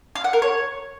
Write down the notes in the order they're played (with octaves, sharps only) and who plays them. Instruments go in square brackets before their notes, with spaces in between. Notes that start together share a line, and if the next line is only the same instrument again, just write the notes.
[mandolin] F5
F#5
A#4
C#5